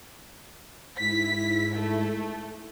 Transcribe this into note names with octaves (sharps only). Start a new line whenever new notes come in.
G#2 E4 B6
A3